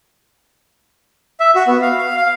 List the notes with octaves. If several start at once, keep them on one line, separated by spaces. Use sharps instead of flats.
E5
F#4
B3
F5
F5
F5